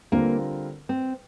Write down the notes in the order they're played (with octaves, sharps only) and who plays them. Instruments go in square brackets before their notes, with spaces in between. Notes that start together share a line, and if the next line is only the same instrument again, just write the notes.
[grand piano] D3 G3 C4 F4 A#4 [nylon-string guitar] A#3
[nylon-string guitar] C4